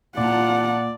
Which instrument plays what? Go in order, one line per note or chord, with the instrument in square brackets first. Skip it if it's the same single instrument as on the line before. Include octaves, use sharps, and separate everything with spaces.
[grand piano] A#2 [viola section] F4 A5 A#5 [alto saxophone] D5 [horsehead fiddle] F#5